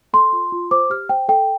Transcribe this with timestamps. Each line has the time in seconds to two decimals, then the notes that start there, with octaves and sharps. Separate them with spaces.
0.13 A4 C6
0.33 F4
0.52 F4
0.71 C5 D6
0.90 G4 F6
1.09 C5 G5
1.28 A4 G5